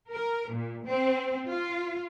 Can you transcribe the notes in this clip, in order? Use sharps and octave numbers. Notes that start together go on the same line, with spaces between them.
A#4
A#2
C4
F4